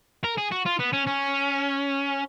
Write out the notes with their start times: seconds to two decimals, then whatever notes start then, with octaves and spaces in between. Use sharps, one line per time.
0.24 A#4
0.38 G#4
0.51 F#4
0.65 F4
0.79 B3
0.93 C#4
1.07 C#4